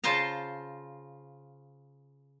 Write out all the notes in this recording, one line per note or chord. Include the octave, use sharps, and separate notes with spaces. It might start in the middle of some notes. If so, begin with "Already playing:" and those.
C#3 F4 C5 F5 A5 A#5